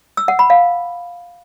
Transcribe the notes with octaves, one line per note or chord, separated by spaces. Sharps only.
E6
F#5
B5
F5